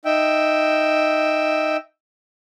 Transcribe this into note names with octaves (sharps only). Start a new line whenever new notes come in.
D#4 E5 G5